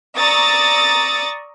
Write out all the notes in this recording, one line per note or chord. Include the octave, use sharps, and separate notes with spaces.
D5 A#5 C#6 D#6 E6 A6